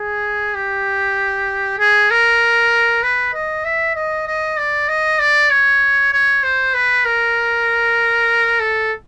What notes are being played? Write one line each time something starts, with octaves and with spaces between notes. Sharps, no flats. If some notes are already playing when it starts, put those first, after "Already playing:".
Already playing: G#4
G4
G#4
A#4
B4
D#5
E5
D#5
D#5
D5
D#5
D5
C#5
C#5
C5
B4
A#4
A4